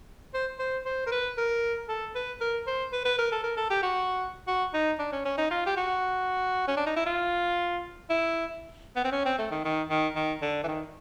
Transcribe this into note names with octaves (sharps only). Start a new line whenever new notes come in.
C5
C5
C5
A#4
B4
A#4
A4
B4
A#4
C5
B4
B4
A#4
A4
A#4
A4
G4
F#4
F#4
D#4
D4
C#4
C#4
D#4
F4
G4
F#4
C#4
D4
D#4
E4
F4
E4
B3
C4
C#4
C4
A3
D#3
D#3
D#3
D#3
D3
E3
D#3